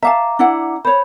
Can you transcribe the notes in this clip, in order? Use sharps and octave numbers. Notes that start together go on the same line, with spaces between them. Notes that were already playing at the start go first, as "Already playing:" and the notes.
E5 F5 A5 A#5 D6
D4 E4 F#5
C5 C#5 B5